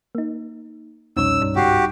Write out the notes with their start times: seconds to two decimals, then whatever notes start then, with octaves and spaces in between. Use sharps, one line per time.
0.15 A#3 D#4
1.17 C2 F2 B2 G3 C#4 D#4 C#5 E6
1.42 G2
1.56 C#2 G#2 F#4 G4 C7